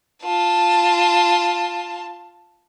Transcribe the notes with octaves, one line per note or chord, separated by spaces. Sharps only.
F4 A5